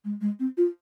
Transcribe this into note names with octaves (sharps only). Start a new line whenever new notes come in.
G#3
G#3
C4
F4